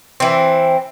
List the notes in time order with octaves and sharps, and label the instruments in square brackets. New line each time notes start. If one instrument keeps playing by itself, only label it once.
[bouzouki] E3 C4